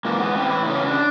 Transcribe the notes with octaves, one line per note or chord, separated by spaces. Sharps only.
G#2 E3 A#3
B3
A2 E3 C4
E4
E2 C#3 E3 D#4
C#4
D4